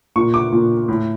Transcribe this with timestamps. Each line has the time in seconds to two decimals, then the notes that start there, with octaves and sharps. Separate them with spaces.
0.16 A#2 C#6
0.34 D6
0.52 A#2
0.88 A2